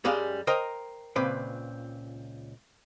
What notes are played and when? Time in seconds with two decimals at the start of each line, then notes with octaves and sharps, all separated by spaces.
0.05 F#2 G3 G#3 G4 F5
0.47 A#4 C5 D#5 G5 A#5
1.16 C#2 A#2 C4 B4 G5